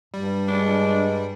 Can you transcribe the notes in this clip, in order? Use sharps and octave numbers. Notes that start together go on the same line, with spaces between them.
G2 G3
G#3 D4